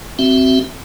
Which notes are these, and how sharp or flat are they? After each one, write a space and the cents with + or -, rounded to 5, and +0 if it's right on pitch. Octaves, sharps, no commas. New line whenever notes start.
C4 +0 F#4 +30 E5 +5